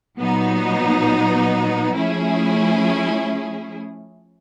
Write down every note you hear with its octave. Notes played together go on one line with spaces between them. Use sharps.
A#2 F#3 B3 D#4
F3 A3 C#4 E4 G#4